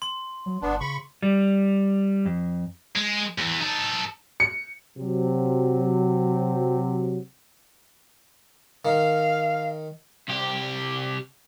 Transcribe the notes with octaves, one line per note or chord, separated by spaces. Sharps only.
C6
F#3
G1 B3 D4
C#3 B5 C#6
G3
F2
G#3
E2 E3
D#4 A4
C#7
C3 F#3
D#3 F5
C2 G4